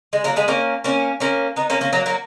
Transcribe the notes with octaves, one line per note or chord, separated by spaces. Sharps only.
G#3
F#3 A#3
G#3 B3
A#3 C#4
A#3 C#4
A#3 C#4
B3 D#4
A#3 C#4
A#3 C#4
F#3 A#3
F#3 A#3